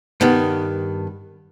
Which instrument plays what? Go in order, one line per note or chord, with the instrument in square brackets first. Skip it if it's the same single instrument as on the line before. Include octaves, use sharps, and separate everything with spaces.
[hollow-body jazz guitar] G2 D#3 B3